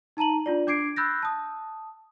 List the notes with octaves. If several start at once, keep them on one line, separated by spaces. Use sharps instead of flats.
D#4 A5 A#5 D#7 F#7
D4 F4 D5
D4 D6 G#6 C7 D7
B5 E6 F#6 G6 A6 A#6
A5 D#6